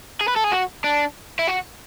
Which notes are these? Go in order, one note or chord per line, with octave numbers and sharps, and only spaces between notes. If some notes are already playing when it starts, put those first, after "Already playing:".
G#4
B4
A4
G#4
F#4
D4
E4
F#4